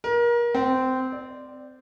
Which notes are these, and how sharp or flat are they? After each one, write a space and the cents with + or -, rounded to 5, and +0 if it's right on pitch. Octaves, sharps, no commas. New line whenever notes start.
A#4 +30
C4 -15
D5 +10